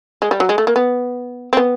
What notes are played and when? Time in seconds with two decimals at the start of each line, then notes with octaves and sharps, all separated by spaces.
0.22 G#3
0.31 G3
0.40 F#3
0.49 G#3
0.58 A3
0.67 A#3
0.76 B3
1.53 C4
1.57 B3